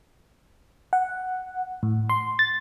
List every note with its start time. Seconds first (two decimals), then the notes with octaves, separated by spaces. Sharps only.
0.93 F#5
1.83 A2
2.09 C6
2.39 A6